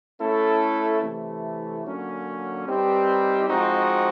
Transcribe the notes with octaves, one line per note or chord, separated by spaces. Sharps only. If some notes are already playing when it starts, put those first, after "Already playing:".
A3 C#4 E4 A4
C3 E3 A3
D3 F#3 A#3 C#4
G3 C4 D#4 G4 B4
F3 G#3 C4 D#4 F#4